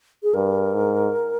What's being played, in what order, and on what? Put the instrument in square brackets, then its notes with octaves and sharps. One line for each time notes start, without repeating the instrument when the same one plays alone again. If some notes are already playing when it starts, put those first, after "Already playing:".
[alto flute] G#4
[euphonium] G2 [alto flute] A#4
[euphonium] G#2